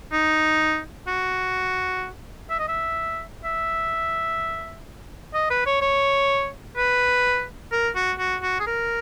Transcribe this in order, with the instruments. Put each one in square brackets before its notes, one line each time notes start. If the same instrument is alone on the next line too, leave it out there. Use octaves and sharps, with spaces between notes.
[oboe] D#4
F#4
E5
D#5
E5
E5
D#5
B4
C#5
C#5
B4
A#4
F#4
F#4
F#4
G#4
A#4